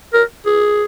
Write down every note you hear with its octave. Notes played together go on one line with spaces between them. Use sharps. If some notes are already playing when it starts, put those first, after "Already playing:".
A#4
G#4